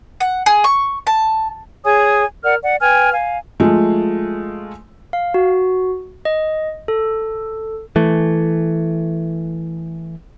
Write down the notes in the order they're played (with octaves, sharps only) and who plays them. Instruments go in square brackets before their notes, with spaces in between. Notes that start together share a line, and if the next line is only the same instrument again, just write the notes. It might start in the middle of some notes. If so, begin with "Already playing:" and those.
[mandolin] F#5
G#4
C#6
A5
[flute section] G#4 C#5 G#5 D#6
A#4 D5 F#5 F6
D5 F#5
B4 G5 G#5 F6
F5 G#5
[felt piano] F3 G#3 A3 F4
[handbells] F5
F#4
D#5
A4
[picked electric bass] E3 A3